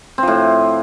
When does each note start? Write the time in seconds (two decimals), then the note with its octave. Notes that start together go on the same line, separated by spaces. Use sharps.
0.18 C4
0.23 F3
0.27 A2